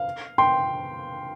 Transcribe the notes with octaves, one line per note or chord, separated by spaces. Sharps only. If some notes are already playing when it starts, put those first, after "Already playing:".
Already playing: F5
G5 C6